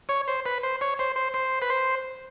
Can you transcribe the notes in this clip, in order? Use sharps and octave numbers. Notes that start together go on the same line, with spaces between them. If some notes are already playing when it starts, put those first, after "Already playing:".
C#5
C5
B4
C5
C#5
C5
C5
C5
B4
C5